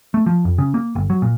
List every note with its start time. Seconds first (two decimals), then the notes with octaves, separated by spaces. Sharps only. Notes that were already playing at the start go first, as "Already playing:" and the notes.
0.14 A3
0.26 F3
0.45 F2
0.58 C#3
0.74 A#3
0.95 G1
1.10 F#3
1.22 A#2